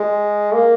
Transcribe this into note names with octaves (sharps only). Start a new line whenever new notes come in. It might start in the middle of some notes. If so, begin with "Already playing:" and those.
Already playing: G#3
A#3